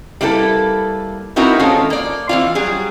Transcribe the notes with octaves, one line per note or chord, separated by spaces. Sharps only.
G3 A#3 E4 G#4 A4 B4
B3 C4 D#4 E4 F#4 A#4
D#3 G#3 C4 C#4 F4 A4
A#3 D5
E3 C4 F4
F#3 G3 G#4